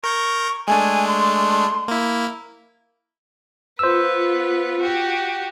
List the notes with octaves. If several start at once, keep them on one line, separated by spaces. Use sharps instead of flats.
A#4 C#6 G6 A#6
G#3 A3 D4 G#5
C6
A#3 E4
B3 F4 B4 C5 E6
F#4 G4